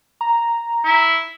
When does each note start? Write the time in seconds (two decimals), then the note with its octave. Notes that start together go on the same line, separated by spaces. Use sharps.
0.21 A#5
0.85 E4